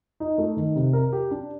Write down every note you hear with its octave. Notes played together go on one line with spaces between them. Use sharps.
D#4
A3
D#3
C3
A#4
G4
D4